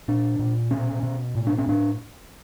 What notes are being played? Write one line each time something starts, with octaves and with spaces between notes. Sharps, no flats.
A#2 D4
A#2
B2 C#4
B2
A2
D4
C#4
A2 D4